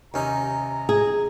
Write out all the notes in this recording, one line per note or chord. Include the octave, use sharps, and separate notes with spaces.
D#2 C3 C#4 D#4 A#5
G#4